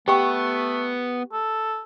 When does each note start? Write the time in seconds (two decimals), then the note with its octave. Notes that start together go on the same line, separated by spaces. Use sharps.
0.08 A3 B3 G4 G5 C#6
1.33 A4